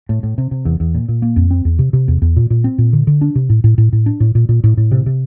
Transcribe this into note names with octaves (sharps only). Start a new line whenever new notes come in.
A2
A2
C3
C3
E2
E2
A#2
A#2
A#3
F2
C4
E2
C3
C3
E2
E2
A#2
A#2
C4
A#2
D3
D3
D4
C3
A2
A2
A2
A2
D4
A2
A#2
A#2
A2
A2
C3
C3